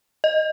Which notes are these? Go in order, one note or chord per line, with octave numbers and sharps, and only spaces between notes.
D#5